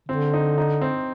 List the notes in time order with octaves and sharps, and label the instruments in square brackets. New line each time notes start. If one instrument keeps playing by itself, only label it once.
[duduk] D3 [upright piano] C4
[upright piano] D#4
D#4
C4